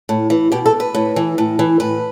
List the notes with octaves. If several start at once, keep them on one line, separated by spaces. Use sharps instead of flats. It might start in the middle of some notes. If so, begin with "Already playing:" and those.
A2
E3
B2 G4
A4
B4
A2
E3
A2
E3
A2 B4